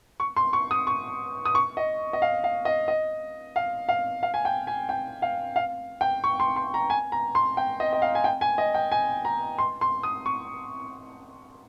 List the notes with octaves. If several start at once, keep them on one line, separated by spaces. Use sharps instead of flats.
C#6
C6
C#6
D#6
C#6
D#6
C#6
D#5
D#5
F5
F5
D#5
D#5
F5
F5
F5
G#5
G5
G#5
G5
F5
F5
G5
C#6
C6
C6
A#5
G#5
A#5
C6
G5
D#5
D#5
F5
G#5
G5
G#5
D#5
G5
G#5
A#5
C6
C6
D#6
C#6